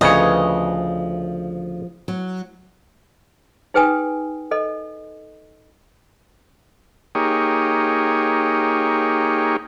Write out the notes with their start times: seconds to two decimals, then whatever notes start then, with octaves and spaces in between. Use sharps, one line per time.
0.01 D2 C#3 F3 B4 C#5 D#5
2.08 F#3
3.74 D#4 G#4 B4 G5 G#5 D#6
4.51 A4 D#5
7.15 A#3 D#4 G4 G#4 C#5